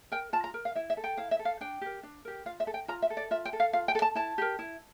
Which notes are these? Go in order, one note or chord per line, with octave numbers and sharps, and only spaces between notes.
A#4 G5
F4 A5
A#5
A#4
F5
E4 E5
E5
A4
G5
E4 F5
E5
A4
F5
D4 G5
G4 A#4
D4
G4 A#4
F4 F5
E5
A4
G5
F4 A#5
E5
A4
D5
F4 E5
G5
A4
F5
F4 F5
G5
A4
A5
E4 A5
G4 A#4
E4